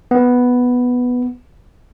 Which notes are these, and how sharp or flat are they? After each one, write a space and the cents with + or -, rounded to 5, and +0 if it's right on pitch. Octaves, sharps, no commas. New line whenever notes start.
B3 +0